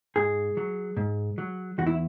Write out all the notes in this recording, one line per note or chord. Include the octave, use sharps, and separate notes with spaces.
G#2 G#4
F#3
G#2
F#3
E2 F#4
E4